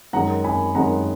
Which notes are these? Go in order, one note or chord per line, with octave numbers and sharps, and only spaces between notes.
F#2 D#3 G#3 F#5 A#5
G#5 B5
F#2 D#3 G#3 F#5 A#5